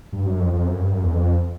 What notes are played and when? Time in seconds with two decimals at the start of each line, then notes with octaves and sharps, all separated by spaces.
0.13 G2
0.26 F#2
0.40 F2
0.53 F2
0.66 F#2
0.80 G2
0.93 F#2
1.03 E2
1.14 F2